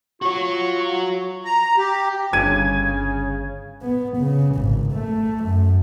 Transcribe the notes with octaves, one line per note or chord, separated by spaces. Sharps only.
F4 F#4 C#5 C#6
A#5
G4
G1 C#3 G#5 G#6 D#7
B3
C#3
G#1
A3
F#2